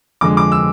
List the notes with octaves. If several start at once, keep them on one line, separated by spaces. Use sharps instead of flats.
F2 D3 G#3 D6
D6
E6